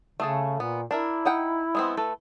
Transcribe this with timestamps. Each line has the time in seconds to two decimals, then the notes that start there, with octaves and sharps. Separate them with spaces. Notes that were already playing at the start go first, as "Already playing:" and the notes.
0.20 C#3 A3 G#4 A4
0.60 A#2 B3
0.91 D4 E4 A#4 E5
1.25 D#4 F#5 G5
1.75 G#3 B3 C4
1.97 A3 A4 B4